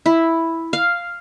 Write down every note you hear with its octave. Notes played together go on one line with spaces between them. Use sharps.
E4
F5